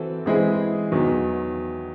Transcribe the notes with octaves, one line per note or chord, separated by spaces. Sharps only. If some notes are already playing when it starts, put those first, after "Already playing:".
Already playing: E3 C4 F#4 A4
E3 G#3 C4 E4 G#4
E2 D#3 F#3